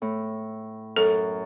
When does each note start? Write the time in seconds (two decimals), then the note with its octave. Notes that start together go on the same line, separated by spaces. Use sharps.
0.02 A2
0.96 F#2 A4